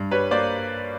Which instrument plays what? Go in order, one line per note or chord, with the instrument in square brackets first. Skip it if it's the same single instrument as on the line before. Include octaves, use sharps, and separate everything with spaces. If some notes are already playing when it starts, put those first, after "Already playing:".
Already playing: [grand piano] G2
G3 B4 C#5
A#3 C5 D5